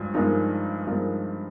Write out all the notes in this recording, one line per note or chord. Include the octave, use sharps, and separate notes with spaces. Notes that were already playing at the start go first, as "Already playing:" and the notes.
Already playing: G2 F3 G#3
G2 F3 G#3 D#4 A#4
G2 F3 G#3 D#4 A#4